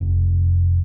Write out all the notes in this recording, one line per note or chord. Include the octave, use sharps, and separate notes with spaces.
F1